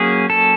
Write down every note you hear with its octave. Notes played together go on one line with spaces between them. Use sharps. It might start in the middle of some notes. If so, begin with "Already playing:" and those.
Already playing: F#3 A#3 C#4 G#4
A4